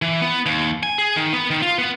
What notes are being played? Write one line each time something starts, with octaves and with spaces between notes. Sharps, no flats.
E3
B3
D#2
G#5
G#4
D#3
B3
D#3
F4
B3